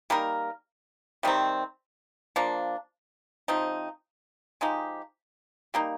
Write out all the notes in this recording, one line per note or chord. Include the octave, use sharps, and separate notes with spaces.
G3 A#3 D#4 A#4
C3 D#3 G3 C4
F3 A#3 D4
C3 F3 C4 D#4
F3 G#3 D#4 G4
G3 A#3 D#4